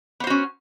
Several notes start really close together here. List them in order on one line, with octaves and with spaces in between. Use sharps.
B3 C5 F#4 C#4